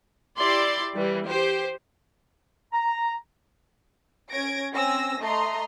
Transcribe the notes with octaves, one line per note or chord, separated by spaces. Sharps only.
E4 G4 D5 C6
E3 G3
G4 C5
A#5
C#4 G#6 A#6 D7
C4 C#4 G#5 E6 A#6
A3 D#5 A#5 C6